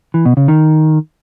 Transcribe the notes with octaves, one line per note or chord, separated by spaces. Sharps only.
E3
B2
C#3
D#3